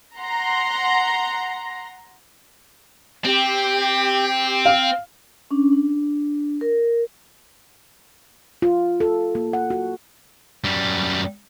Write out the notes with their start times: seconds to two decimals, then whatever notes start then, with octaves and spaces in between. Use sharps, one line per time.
0.17 F#5 A#5 C6
3.24 C4 G4
4.65 F5
5.51 C#4 D4
5.72 D4
6.61 A#4
8.62 F4
9.00 A4
9.35 A#3
9.53 F#5
9.70 F#4
10.64 F#2 G3